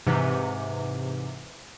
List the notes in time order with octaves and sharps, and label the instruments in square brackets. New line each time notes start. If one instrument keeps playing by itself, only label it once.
[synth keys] G#2 C3 E3